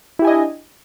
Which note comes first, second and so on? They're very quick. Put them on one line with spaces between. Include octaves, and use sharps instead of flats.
E4 G4 G#5 D#5 D4